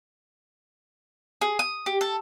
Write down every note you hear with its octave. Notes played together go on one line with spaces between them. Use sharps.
G#4
D#6
G4
A4